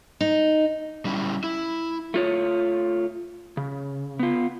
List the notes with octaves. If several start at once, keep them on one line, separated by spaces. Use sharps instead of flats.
D#4
G3 C#4 E4
E4
A3 F4 C#5
C#3
B3 F4